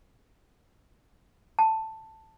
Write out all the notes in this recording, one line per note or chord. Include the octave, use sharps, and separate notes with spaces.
A5